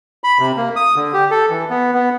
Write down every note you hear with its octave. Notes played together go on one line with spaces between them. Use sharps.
B5
C3
A#3
D#6
D3
G4
A4
E3
B3
B3